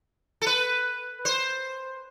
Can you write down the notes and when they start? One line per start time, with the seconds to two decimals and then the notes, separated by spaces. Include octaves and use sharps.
0.42 A4
0.46 B4
1.25 C5